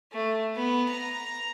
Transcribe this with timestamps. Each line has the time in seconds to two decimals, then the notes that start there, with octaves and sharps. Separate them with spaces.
0.12 A3
0.56 B3
0.89 A#5